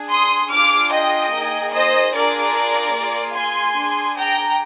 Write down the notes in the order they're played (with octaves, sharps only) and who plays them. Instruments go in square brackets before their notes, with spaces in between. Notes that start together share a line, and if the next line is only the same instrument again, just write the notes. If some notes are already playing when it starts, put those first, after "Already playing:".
Already playing: [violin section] D4 G#4
C6 D#6
D4 F4 G#4 D6 F6
D#5 G5
A#3 D#4 G#4
C5 D#5
D4 F4 G#4 A#4 D5
A#3 F4 G#4
G#5 C6
D4 G#4
G5 A#5